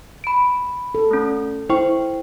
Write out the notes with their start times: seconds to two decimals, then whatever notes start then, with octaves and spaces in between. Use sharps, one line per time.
0.24 B5 D7
0.95 A4
1.11 A3 C#4
1.70 E4 C5 G5 C#6